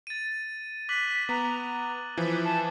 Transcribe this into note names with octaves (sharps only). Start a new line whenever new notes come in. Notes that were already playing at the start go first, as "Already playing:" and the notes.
A6 D#7
D6 F#6 B6 F#7
B3 A#5
E3 F3 B4
A5